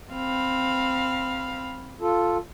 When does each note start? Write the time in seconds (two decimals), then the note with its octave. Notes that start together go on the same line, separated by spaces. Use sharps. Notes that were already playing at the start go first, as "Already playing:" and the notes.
0.14 C4 F5 B5
2.01 F4 A4